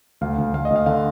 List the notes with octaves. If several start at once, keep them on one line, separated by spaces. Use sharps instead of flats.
D2 F5
D2
D2 F5
D#5
D2
F5
D3 F5